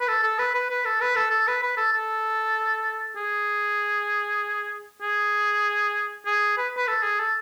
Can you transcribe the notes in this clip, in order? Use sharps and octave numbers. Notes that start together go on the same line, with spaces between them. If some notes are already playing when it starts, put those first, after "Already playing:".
B4
A4
A4
B4
B4
B4
A4
B4
A4
A4
B4
B4
A4
A4
G#4
G#4
G#4
B4
B4
A4
G#4
A4